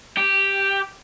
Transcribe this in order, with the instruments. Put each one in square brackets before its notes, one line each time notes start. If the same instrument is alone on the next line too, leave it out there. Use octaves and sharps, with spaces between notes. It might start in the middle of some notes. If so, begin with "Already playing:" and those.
[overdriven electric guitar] G4